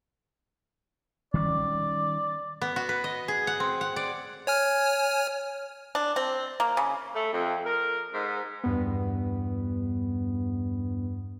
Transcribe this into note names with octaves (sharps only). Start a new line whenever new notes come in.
D#3 G3 C#4 D5
B3
F#4
B4
D#5
G#4
F#5
C4
F#5
D5
C#5 G#5 F6
D4
C4
A#3
C#3
A3
F2
A#4
G#2
E2 G2 B3